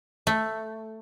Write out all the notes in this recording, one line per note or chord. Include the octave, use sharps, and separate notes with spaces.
A3